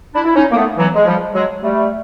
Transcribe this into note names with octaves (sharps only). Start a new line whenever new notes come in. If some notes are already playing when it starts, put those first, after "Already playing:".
D4 E4
E4
C#4 D#4
A#3
A3 B3
E3 F#3
G#3
F3 G3
F#3 G#3
G3 A3